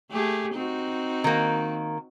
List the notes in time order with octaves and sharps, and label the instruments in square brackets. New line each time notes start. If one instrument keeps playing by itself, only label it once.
[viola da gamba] A3 G4 G#4
C4 D#4 F#4
[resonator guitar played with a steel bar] D#3 A#3